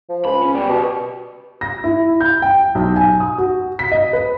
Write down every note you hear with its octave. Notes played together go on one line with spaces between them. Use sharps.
F3
C#2 B5
C#4
G3 B3 G4
B2
A#6
E4
G6
G5
B1
G#5
D#6
F#4
B6
D#5
B4